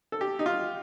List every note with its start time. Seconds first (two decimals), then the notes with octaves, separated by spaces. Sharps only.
0.12 A4
0.21 G4
0.39 D#4
0.46 F4